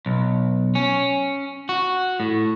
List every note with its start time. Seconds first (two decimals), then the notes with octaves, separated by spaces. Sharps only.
0.06 B1
0.75 C#4
1.69 F#4
2.20 A2